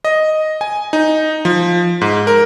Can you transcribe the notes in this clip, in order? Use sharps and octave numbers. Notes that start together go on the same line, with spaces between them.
D#5
G#5
D#4
F3
G#2
A#4